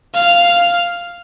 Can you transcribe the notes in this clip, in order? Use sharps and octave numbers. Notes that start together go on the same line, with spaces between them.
F5